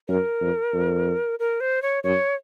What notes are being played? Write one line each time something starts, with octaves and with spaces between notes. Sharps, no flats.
F#2 A#4
F2
F2
A#4
C5
C#5
F#2 C#5